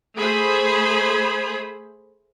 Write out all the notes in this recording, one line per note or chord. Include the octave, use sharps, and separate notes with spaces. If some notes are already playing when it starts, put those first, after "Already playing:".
A3 G#4 C5 B5